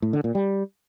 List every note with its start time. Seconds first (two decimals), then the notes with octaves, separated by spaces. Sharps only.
0.02 A2
0.13 D3
0.24 A#2
0.35 G3